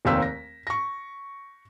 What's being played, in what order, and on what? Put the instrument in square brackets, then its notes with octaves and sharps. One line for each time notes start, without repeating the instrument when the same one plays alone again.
[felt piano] F1 D#2 C4 F5 E6 B6
A#6
C#6 A#6